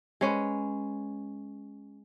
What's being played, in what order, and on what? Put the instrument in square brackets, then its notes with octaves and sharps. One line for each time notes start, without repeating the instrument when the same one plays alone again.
[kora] G#3 C#4 B4